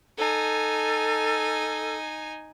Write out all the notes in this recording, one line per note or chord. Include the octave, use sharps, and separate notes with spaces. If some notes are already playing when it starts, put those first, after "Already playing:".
D#4 A4 G#5